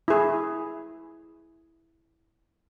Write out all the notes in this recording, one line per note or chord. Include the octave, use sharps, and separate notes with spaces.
E4 G#4